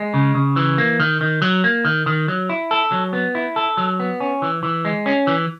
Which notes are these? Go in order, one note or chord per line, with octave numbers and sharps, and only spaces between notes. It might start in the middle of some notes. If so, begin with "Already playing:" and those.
Already playing: G#3
C#3
C#3
E3
A#3
D#3
D#3
F#3
A#3
D#3
D#3
F#3
E4
A4
F#3
B3
E4
A4
F#3
B3
C#4
E3
E3
G#3
C#4
E3